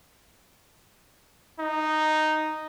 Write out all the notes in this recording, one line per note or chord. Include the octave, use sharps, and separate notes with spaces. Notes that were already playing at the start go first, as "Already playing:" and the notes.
D#4